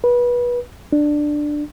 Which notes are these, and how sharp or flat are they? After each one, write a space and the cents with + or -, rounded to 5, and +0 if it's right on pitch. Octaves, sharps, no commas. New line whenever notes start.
B4 -25
D4 +10